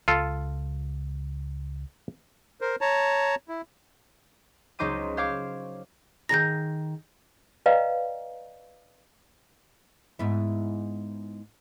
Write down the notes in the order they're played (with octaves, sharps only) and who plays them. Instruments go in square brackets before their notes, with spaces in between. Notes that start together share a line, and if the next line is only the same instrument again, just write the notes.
[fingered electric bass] C#2 [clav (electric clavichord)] F4 A4
[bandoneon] A#4 C5
C#5 A5 A#5
E4
[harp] C#2 F#3 D#4 C5 D6 D#7
C5 C#5 F5 D6
[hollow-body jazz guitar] D#3 G#4 A#5 [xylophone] G6 A#6
[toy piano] B4 D5 D#5 F5 G5 A#5
[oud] G#2 B3 E4